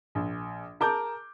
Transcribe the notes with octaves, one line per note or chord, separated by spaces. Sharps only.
A#1
G#4 A#4 A5 D6 G6